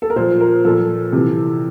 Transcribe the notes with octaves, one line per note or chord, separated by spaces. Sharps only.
A4
A#4
A#2 F3 C5
A#4
A#2 F3 A4
C3 E3